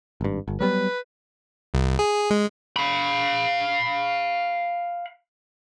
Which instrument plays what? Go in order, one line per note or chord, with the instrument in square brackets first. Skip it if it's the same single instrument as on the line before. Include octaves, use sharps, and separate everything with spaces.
[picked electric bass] G#1 G2
G1
[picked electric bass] F#3 G3 B3 [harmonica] B4
[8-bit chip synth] C2
G#4
G#3
[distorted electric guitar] F5 B5